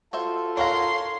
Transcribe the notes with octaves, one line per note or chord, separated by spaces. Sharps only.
F4 F#4 A4 C5 E5
A#4 C#5 F5 F#5 A#5 C6